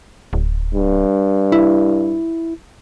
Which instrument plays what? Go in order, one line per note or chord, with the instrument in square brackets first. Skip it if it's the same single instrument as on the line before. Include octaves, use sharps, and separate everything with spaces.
[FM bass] D1
[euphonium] G2
[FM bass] E4